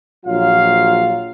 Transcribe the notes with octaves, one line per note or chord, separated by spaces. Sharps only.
A#1 F#3 F4 F5